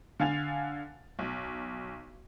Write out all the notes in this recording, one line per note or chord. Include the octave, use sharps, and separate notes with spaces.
D3 F5 G#5 A6 F7
B1